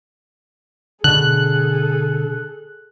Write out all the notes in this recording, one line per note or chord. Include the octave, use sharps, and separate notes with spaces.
B2 D3 G#4 A4 F#6